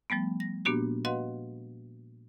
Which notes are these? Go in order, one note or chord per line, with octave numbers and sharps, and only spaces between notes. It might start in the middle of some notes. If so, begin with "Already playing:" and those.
F3 G3 A3 B3
A#6
A#2 A#3 B3 D4 F#4 G4
F#4 B4 D#5 F5 F#5 C6